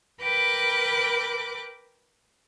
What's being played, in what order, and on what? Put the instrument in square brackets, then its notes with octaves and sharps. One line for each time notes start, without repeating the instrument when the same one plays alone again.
[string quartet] A#4 B4 G5 B5 D6 F#6